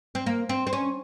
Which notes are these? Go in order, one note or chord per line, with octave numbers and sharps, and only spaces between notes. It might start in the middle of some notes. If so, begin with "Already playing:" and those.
C4
A#3
C4
C4
C#4